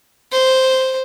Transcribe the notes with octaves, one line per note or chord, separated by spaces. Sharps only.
C5